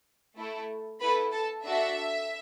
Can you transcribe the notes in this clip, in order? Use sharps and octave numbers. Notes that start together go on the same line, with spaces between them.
A3 E4 A4
B3 E4 A4 B4 B5
A4 A5
D4 F#4 A4 E5